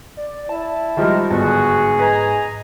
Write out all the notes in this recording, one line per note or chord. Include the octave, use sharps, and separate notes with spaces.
D5
E4 A5
D#3 F3 G3 G#3 A#4
G1 G#2 F#4 G#4
B4 D#5 G#5 A#5